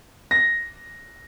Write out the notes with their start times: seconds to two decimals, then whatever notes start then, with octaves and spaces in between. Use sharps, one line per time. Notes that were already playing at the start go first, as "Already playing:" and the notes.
0.31 A#6